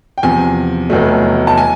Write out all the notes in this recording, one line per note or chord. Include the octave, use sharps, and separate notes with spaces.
G5
E2 C3 F3 G#5
F1 E2 B2 F#3 A3
A5
G#5